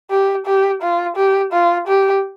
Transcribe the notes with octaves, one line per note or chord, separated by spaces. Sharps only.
G4
G4
F4
G4
F4
G4